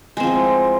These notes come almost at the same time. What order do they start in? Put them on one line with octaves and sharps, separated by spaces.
G#3 C4 F3 E4